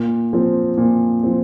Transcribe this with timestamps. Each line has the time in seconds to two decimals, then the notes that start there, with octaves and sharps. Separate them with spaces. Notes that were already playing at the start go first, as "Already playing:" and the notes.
Already playing: A#2
0.33 F3 C4
0.77 A#2
1.23 F3 C4